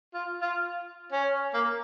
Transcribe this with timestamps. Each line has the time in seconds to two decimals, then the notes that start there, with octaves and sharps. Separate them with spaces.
0.14 F4
0.42 F4
1.12 C#4
1.54 A#3